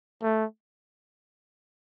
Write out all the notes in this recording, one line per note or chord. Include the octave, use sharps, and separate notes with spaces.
A3